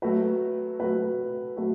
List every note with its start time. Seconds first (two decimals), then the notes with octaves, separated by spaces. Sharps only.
0.02 F#3 A3 F#4 B4
0.80 F#3 A3 F#4 B4
1.57 F#3 A3 F#4 B4